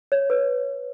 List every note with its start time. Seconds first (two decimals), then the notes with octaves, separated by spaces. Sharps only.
0.12 C#5
0.30 B4